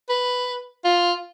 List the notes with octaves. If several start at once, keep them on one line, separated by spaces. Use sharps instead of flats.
B4
F4